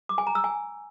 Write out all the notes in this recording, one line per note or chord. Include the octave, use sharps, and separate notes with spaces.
D6
G#5
A#5
E6
G#5